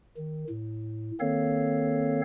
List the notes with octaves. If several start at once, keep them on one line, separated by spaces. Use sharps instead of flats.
D#3
A2
D#3 A#3 C4 A4 C#5 F5